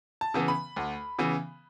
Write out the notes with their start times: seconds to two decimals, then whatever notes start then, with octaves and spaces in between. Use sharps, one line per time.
0.21 A5
0.34 C#3 E3 B3
0.48 B5
0.76 D2
1.19 C#3 E3 B3